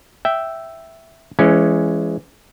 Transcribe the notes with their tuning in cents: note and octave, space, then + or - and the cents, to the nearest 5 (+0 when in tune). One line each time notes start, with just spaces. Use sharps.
E5 +0 G5 -10
E3 +30 G#3 +5 C#4 +0